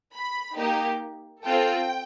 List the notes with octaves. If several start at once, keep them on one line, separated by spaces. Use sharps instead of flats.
B5
A#3 D#4 G4
C4 F4 A4 G5